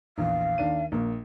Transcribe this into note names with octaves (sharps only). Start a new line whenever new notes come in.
A#1 E2 F5
D#2 D4 D#7
A#1 A#3 A#4